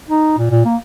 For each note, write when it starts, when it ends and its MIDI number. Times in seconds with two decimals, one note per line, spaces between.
0.09 0.36 63
0.38 0.49 46
0.51 0.63 46
0.65 0.76 58